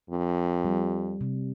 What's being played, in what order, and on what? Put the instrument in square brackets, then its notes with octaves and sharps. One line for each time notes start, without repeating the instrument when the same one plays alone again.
[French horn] F2
[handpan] G3
C3